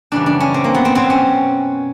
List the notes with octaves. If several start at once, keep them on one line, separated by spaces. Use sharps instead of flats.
F#2 C#3 E3 G3 D4
D4
C#4
C4
A#3
B3
C4
B2 F#3 C4
C#4